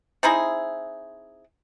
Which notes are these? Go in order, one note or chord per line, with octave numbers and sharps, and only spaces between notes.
C4 D#4 E4 G#4